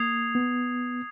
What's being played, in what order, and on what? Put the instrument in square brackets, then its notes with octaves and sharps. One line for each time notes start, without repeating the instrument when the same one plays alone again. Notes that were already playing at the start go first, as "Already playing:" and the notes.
Already playing: [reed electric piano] A#3 [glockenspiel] D#6 G#6 C7 F7
[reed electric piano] B3